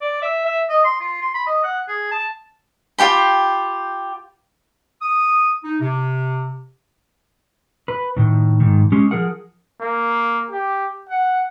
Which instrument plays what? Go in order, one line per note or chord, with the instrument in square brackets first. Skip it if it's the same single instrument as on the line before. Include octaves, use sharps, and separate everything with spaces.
[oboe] D5
E5
E5
D#5
C6
F4
C6
B5
D#5
F#5
G#4
A5
[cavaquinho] F4 G4 G5 B5
[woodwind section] D#6
D#4
C3
[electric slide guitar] B4
A2 D#3
G#2 D#3
G#3 C#4 G4
F3 G#4 A#4 F#5
[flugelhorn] A#3
G4
F#5